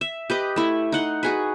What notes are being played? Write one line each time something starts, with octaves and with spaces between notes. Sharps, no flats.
E5
G4 B4 D#5
A3 E4
D#4 F#5 C6
F#4 G#4 B4